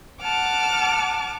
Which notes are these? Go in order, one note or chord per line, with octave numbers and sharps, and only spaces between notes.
F#5 A5 D6 F6